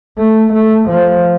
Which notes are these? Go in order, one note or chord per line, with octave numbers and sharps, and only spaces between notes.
A3
A3
F3